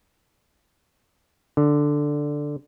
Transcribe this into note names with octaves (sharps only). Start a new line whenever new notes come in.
D3